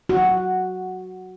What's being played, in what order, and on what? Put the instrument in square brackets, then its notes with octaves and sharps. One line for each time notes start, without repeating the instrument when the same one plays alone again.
[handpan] F#4